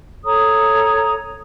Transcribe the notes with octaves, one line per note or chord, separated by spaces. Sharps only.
A4 C#5 A#5 D#6